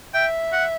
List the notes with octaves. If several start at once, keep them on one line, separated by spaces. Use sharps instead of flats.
E5 G5
F#5